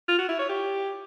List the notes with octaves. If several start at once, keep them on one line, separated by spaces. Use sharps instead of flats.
F4
F#4
E4
C#5
G4